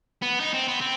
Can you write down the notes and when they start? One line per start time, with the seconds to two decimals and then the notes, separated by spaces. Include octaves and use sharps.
0.22 B3
0.40 D#4
0.53 C4
0.68 B3
0.81 C4